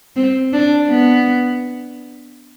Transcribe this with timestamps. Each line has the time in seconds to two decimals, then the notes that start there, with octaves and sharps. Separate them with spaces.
0.16 C4
0.53 D4
0.88 B3